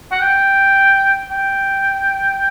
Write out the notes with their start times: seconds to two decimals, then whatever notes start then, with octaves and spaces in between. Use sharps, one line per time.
0.12 F#5
0.21 G5
1.30 G5